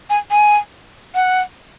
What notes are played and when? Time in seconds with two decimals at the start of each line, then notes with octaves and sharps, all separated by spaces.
0.10 G#5
0.31 G#5
1.15 F#5